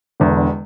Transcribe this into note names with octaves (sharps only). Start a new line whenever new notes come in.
E1 E2 D3